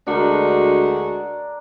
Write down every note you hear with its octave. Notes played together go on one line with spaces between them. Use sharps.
D2 G#3 D4 F#4 A#4